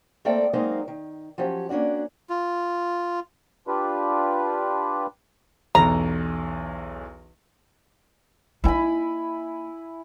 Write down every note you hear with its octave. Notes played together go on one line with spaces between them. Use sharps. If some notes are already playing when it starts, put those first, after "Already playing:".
A3 A#3 C4 A4 D5 G5
F#3 G#3 A#3 C4 D#4 F5
D#3
F3 F#3 C#4 G4
A#3 C#4 D4 F#4 D5
F4
D4 F4 G4 B4
B1 E2 A#5
A#3 D#4 E4 G#5 B5